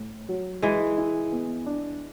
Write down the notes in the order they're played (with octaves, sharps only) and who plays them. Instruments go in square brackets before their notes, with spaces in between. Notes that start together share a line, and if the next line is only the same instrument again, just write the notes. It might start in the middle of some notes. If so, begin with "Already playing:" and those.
Already playing: [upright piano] A2
F#3
[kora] E3 G#3 [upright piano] E4
[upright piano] E4
B3
D4